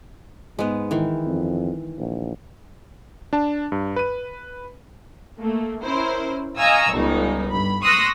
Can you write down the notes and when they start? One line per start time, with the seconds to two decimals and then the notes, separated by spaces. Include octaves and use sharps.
0.59 G#2 G#3 B3
0.91 D#3 E3
1.26 F2
1.98 A#1
3.33 D4 A5
3.72 G2
3.96 B4 D#7
5.38 A3 A#3
5.83 C#4 E4 A#4 C5
6.59 D#5 F5 G#5 A#5 C#6 E6
6.94 G1 C#2 G3 D#4
7.50 G2 B5
7.83 C6 C#6 D#6 E6 F#6 A#6